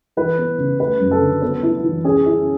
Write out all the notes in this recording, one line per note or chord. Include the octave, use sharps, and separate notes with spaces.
E3 B4
B3
C#3
A3 B4
F#2
A4
D3
B3
E4
E3
C#4 G#4
E4